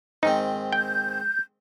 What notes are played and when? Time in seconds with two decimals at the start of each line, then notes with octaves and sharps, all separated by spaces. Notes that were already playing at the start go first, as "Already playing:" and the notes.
0.23 G#2 D#3 C4 D#4
0.73 G5 G6